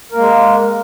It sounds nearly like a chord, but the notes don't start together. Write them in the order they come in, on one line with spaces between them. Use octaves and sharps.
A#4 A#3 G#3